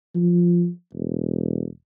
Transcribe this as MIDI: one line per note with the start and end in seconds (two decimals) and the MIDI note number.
0.15 0.68 53
0.93 1.67 28